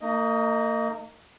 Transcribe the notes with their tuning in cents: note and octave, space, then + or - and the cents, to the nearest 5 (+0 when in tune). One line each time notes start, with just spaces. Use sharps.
A#3 -40 D#4 +0 D#5 +0